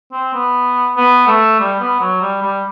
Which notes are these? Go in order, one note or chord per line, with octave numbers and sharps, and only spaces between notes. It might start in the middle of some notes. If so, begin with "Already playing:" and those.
C4
B3
B3
A3
G3
B3
F#3
G3
G3